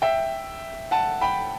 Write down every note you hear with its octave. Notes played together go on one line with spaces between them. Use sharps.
E5 G5
F#5 A5
G5 B5